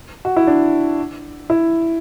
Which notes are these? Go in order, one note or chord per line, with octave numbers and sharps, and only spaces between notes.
F#4
E4
D4
E4